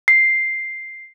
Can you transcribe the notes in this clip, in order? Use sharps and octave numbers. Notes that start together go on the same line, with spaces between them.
C7